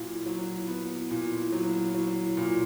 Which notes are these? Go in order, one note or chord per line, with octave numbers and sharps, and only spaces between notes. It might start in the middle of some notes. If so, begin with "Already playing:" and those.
Already playing: A#2 F#3 E4
F#3
B3
A#2 E4
F#3
F#3 E4
A#2